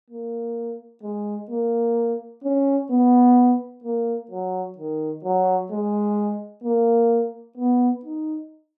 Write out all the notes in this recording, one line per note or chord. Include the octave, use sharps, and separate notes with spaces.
A#3
G#3
A#3
C#4
B3
A#3
F#3
D#3
F#3
G#3
A#3
B3
D#4